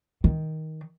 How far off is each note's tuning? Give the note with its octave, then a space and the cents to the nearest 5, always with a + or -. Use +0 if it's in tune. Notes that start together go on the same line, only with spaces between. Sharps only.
D#3 +15